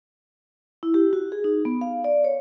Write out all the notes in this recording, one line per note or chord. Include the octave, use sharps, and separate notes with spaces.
E4
G4
F#4
G#4
D#4
B3
F5
D5
C#5